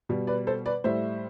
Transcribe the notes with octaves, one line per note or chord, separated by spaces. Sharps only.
B2 G3
B4 D5
A4 C5
B4 D5
A2 G3 C5 E5